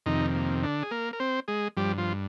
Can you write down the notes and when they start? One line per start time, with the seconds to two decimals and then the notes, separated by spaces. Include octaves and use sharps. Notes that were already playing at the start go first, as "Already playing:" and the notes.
0.06 F2 C3 D#3 D#4
0.35 A#3
0.63 D3 D4
0.82 G#4
0.91 A#3 A#4
1.13 A#4
1.20 C4 C5
1.48 G#3 G#4
1.77 G2 F3 G3 G4
1.98 F3 F4